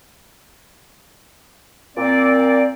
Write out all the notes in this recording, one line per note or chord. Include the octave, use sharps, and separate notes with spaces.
A#2 C4 D5